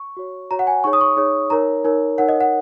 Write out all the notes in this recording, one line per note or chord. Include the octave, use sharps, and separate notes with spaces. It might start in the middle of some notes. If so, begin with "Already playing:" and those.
Already playing: C#6
F#4 C#5
F#4 C#5 A#5
F#5
G#5
D#4 G#4 C#5 C#6
D#6
C#6
D#4 G#4 C#5
D#4 A#4 C#5 A#5
D#4 A#4 C#5
D#4 A#4 C#5 F#5
D#5
F#5